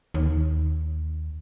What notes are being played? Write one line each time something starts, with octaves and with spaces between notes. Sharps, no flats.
D#2